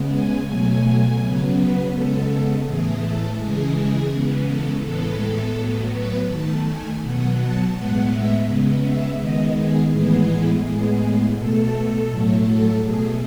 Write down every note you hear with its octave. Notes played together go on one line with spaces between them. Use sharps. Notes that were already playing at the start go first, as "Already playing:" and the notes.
Already playing: C#3 G#3 B3
G#5
B2 F#3 A3 G#5
C#3 F#3 B3
B4
C#3 G#3 B3 A4
A2 E3 A3 G#4
A4
C#3 E3 G#3 G#4
C#3 E3 G#3 B3
A4
A2 E3 G#3 B3 A4
A2 F#3 B3
B4
D#3 A3 A5
G#5
B2 F#3 B3 F#5
A5
A2 G#3 B3 F#5
E5
C#3 G#3 B3
E5
D#3 G#3 B3 D#5
G#4
A2 E3 G#3 B3 G#4
A2 G#3 B3 G#4
B2 A3 A4
A2 F#3 A3
A4
B2 A3 G#4